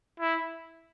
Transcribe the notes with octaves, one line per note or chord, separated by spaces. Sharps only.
E4